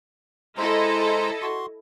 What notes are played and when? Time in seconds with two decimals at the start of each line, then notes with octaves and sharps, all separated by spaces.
0.58 G#3 E4 A4 C5 D#5 A#5
1.42 F#4 C6